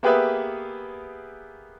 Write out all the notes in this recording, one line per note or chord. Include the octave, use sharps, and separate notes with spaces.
A#3 B3 G4 G#4 B4 E5